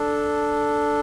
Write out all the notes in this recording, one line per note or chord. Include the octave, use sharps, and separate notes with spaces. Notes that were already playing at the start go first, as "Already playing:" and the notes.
Already playing: D4 A4